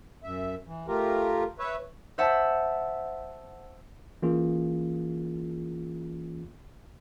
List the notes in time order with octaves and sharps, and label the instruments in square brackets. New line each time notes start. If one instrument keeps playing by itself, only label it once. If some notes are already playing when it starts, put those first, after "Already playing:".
[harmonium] F#2 E5
E3
A3 F4 G4 A#4
B4 C#5 E5
[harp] C5 C#5 E5 F#5 A5
[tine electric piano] E3 A#3 C#4 F4 G#4